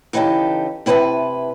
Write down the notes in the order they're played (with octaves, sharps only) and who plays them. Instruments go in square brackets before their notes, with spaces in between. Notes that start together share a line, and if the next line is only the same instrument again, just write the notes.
[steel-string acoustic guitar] C#3 E3 D#4 G4 A4
C3 E4 B4 G#5 A5